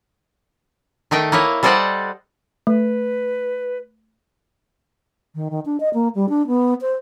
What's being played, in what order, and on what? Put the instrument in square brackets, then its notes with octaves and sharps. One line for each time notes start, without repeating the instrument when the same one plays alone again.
[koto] D#3 A3 D#5 G5
A#3 E4 C#5 D#5
G3 A4 C5 D5 D#5 F#5
[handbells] A3 [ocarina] B4
[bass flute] D#3
D#3
D4
D#5
A#3
G3
D4
B3
C5